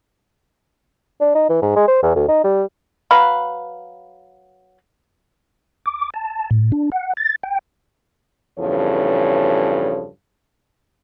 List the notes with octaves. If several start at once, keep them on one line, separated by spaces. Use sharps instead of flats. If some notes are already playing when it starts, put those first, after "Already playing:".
D4
D#4
E3
G#2
G#3
C5
E2
D2
D#4
G3
F#3 B4 F5 B5
D6
A5
A2
D4
F#5
A6
G5
E2 G2 C#3 F3 A4 C#5